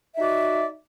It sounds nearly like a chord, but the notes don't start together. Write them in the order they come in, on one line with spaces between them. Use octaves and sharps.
E5 D#4 F#4 D5